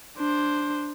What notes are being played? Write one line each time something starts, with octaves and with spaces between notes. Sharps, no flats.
D4 C5